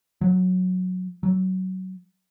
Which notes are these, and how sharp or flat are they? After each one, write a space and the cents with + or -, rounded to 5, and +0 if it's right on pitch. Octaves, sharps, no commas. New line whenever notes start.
F#3 -10
F#3 +15